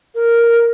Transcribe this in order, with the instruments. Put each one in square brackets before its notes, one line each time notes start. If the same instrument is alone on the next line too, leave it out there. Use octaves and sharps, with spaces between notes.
[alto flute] A#4